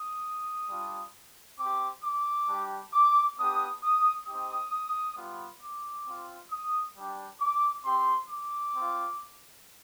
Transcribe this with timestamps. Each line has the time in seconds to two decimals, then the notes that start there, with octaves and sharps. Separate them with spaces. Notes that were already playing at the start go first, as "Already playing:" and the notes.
Already playing: D#6
0.70 G3 D4 F4
1.59 C4 G4 D6
2.04 D6
2.49 G3 D4 G4
2.94 D6
3.38 B3 D4 G4 D#6
3.83 D#6
4.28 C4 D#4 G4 D#6
5.17 G3 B3 F4
5.62 D6
6.07 C4 F4
6.52 D#6
6.96 G3 D4 G4
7.41 D6
7.85 C4 G4 C6
8.30 D6
8.76 C4 F4